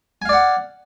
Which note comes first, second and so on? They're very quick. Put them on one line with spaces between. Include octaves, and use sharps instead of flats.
G#5 F5 D5 F#5